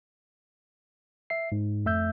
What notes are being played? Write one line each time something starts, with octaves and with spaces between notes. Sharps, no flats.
E5 C7
G#2
F2 A3 E5 E6 G6